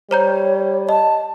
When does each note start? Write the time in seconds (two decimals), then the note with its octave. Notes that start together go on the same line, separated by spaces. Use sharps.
0.11 G3 C5 C#5 A#5 G6
0.89 D#5 A5